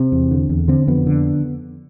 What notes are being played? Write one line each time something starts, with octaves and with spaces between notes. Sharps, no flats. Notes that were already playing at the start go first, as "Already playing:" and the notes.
Already playing: C3 C4
E2
D3
E2
D3 C4
F2 B3
D3